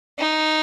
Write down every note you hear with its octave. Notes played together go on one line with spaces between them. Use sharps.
D#4